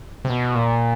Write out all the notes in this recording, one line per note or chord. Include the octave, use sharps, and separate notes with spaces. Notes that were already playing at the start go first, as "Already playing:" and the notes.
C3
B2
A#2